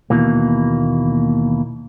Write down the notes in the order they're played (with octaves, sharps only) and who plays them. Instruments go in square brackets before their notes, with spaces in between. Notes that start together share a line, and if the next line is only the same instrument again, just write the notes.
[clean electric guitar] D#2 B2 E3 A#3